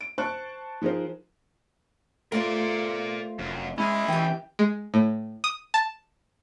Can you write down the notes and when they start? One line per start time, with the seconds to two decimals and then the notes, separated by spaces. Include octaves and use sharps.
0.01 D7
0.18 C5 A5 C#6 F#6
0.82 F3 D#4 G#4 A#4 C5
2.32 A3 F4 A#4 C5 D5
3.39 F1 F#2
3.78 G#3 C#4 E4 D#5
4.08 E3 G4 G5
4.59 G#3
4.94 A2
5.44 D#6
5.74 A5